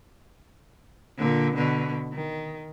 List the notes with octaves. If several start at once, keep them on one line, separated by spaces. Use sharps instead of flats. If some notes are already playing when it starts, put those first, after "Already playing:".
A#2 D3
B2 D3
D#3